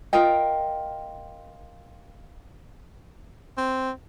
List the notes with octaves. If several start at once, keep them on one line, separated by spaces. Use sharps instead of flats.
F4 A#4 D#5 G5
C4